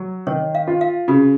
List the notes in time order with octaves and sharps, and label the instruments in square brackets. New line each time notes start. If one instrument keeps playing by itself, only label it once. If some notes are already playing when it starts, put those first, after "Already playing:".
Already playing: [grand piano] F#3
[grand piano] D#3 [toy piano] C#5
[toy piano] F5
[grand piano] F4
[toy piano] F5
[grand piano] C#3 [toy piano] F#4